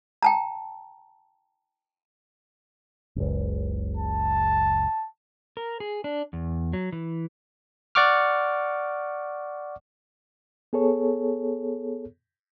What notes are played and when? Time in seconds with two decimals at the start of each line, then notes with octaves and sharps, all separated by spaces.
0.22 G5 A5 A#5
3.16 F#1 C#2
3.97 A5
5.57 A#4
5.80 G#4
6.04 D4
6.33 E2
6.73 F#3
6.92 E3
7.95 D5 F#5 C#6 D6 F6
10.73 B3 G#4 A4 C#5